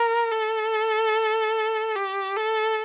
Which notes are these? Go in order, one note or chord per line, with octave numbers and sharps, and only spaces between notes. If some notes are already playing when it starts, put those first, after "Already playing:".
Already playing: A#4
A4
G4
A4